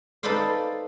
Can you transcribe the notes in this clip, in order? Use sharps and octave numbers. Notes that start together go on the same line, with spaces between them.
D#4 A4 B4 C5 D5 F5